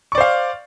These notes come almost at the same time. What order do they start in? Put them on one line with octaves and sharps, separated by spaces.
C#6 D5 C5 F5